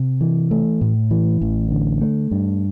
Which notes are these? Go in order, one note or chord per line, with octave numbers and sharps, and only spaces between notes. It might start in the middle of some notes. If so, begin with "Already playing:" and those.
Already playing: C3
E3
A3
A2
E3
A1
D3
A3
G2